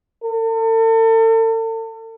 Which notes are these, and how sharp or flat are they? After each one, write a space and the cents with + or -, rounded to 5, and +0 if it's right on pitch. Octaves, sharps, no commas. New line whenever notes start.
A4 +40